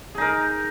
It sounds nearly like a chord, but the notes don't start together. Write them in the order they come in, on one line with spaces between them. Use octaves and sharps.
G#4 D#4 A#4